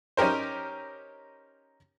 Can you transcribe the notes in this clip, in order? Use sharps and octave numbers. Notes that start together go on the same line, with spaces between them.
C#4 D#4 G4 A#4 C5